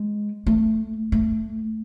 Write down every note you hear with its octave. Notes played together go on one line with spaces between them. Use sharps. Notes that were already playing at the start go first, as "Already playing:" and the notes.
Already playing: G#3
A3
A3